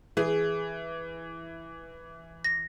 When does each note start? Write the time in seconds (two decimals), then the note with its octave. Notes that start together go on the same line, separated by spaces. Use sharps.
0.17 E3 G#4
2.44 A#6